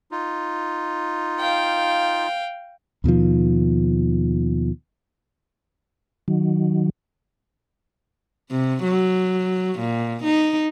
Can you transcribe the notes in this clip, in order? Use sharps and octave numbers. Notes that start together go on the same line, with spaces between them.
D#4 F4
F5 G5
D#2 B2 D#3 F3
D#3 F#3
C3
F#3
A#2
D#4